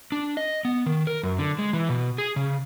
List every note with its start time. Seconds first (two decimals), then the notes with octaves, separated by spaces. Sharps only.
0.12 D4
0.37 D#5
0.65 B3
0.86 D#3
1.07 A#4
1.23 F#2
1.39 D3
1.59 G#3
1.73 E3
1.89 B2
2.18 G#4
2.36 C#3